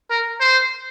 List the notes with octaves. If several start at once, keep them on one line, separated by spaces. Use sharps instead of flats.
A#4
C5